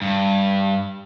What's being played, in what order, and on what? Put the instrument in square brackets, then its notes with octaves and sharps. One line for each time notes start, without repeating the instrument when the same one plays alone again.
[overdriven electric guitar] G2